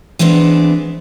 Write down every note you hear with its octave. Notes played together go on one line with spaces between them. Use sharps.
E3 G#3 B3 C4 D4